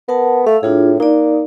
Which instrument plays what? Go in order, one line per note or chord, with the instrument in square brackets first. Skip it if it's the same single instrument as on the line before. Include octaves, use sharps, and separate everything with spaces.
[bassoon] B3 [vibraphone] A#4 F#5 A5
[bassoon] A3 [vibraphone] F5 E6
[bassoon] A2 [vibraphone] D4 F4 G#4
[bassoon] A#3 [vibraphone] D#4 D5